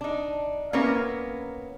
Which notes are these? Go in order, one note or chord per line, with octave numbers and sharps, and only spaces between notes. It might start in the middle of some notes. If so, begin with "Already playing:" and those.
D4 D#4
A#3 B3 C#4 E4 A#4